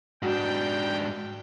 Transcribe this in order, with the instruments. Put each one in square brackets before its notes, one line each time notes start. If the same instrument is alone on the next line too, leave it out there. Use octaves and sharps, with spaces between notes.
[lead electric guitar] G#2 D4 [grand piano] F#4 [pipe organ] G5